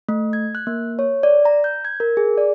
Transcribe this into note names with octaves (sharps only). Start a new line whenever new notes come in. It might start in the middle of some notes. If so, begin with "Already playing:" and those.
A3
G#6
F#6
A#3
C#5
D5
A#5
G6
G#6
A#4
G#4
D5